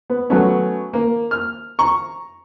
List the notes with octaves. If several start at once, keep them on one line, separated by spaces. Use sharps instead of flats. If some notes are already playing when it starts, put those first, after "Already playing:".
B3
F#3 A3 B3 C#4
A#3
F6
A#5 C#6